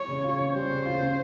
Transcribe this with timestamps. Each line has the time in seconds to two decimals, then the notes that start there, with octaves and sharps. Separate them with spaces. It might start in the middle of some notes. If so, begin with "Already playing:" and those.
Already playing: C#5
0.08 C#3
0.24 F4
0.39 C#4
0.54 G3 C5
0.70 C#3
0.86 F4
1.00 C#4